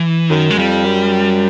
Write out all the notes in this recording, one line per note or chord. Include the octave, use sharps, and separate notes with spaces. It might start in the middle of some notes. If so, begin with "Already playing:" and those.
Already playing: E3
F#2 D#3
G#3
F2 G3
F#2